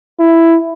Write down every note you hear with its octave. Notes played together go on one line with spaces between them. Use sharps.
E4